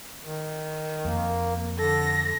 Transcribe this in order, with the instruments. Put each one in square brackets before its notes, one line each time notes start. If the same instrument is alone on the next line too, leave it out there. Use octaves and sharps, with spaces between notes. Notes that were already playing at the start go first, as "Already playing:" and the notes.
[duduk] D#3
[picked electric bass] F2 [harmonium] A#3
[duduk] D3 [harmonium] A4 [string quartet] A#6